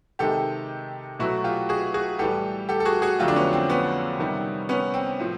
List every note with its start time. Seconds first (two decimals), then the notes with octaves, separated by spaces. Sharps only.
0.19 C3 D#3 G#3 G4 A4
1.19 B2 F#3 A3 E4 F#4
1.44 F4 G4
1.69 F#4 G#4
1.94 F#4 G#4
2.19 A2 E3 G3 G4 A4
2.69 G4 A4
2.80 A4
2.85 F#4 G#4
3.02 F#4 G#4
3.19 F2 D3 F#3 A3 F4 G4
3.28 D4
3.36 B3 C#4
3.53 C4
3.69 B3 C#4
4.18 C3 D#3 G3
4.69 B3 C#4
4.94 C4
5.20 A2 F3